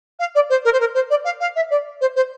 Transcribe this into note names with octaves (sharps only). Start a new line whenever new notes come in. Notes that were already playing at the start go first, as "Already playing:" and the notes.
F5
D5
C5
A#4
C5
A#4
C5
D5
F5
F5
E5
D5
C5
C5